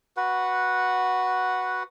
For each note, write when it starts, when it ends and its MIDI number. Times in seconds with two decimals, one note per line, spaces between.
0.17 1.83 66
0.17 1.83 71
0.17 1.83 78